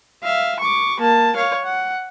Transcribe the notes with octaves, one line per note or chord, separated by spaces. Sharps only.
E5 F5
C#6 D6
A#3 A5
C#5 F5
F#5